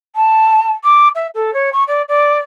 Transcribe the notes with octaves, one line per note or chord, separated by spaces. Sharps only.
A5
D6
E5
A4
C#5
C#6
D5
D5